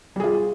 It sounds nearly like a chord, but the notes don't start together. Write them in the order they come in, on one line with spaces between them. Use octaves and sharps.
G3 G#4 F4